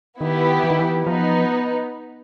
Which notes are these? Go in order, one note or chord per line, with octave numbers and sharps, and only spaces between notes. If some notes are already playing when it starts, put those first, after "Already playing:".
D#3 B3 E4 G4
E3
D#3
E3
F3 B3 D#4